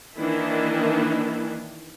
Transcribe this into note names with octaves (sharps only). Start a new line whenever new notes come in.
D#3 E3 A#3 D4 E4